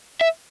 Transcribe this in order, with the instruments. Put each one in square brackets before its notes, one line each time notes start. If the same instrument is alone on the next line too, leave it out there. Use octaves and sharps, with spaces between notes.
[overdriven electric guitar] E5